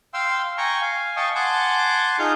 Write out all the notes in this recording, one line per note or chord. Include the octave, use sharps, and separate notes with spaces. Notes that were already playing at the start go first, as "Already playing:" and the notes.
F5 G5 C6 E6
G5 G#5 A#5 C#6
F5 G#5
D#5 F5 G5 A5 C#6 D#6
F#5 G#5 A5 C6 D6
D#4 F4 G#4 F6 G6